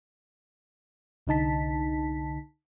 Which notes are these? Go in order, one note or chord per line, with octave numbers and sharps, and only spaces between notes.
C2 D3 D#4 A5 B6